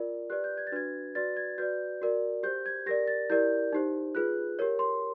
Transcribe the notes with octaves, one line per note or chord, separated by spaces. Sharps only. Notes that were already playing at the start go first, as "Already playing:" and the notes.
Already playing: F4 A#4 D5
G4 B4 D5 F#6
G6
G#6
A6
D4 F#4 B4 G#6
F#4 B4 D5 A6
G#6
F#4 B4 D5 G6
F#4 A#4 D5
G4 C5 G6
G#6
G4 A#4 D5 A#6
A6
E4 G4 A#4 D5 G6
D#4 G4 C5
F4 G#4 B4 F#6
G4 A#4 C#5
C6